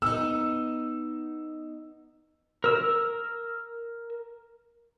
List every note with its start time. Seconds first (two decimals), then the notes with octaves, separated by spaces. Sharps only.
0.02 B3 D#4 E6
2.64 A#4 E6